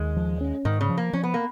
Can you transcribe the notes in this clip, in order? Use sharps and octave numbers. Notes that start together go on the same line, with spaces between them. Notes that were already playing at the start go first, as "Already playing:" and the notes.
Already playing: D#2 G#3
F3
C#4
G#2 D#3
C#3
F3
A#3
F3 C#4
B3
A#3